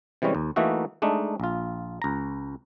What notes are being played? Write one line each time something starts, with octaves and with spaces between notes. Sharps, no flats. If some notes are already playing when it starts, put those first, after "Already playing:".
C3 E3 G3 G#3 C#4
D#2
E3 A3 A#3 D#4 F#4 E5
G#3 A3 D4 D#4
A#1 F4
C#2 A#5